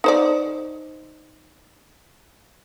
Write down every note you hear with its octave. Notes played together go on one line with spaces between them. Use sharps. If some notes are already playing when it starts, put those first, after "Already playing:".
D#4 C5 D5